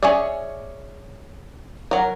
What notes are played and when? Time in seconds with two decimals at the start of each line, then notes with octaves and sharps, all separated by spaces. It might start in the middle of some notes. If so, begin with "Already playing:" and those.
0.03 C#4 G#4 C#5 D5 E5
1.91 F#3 A#4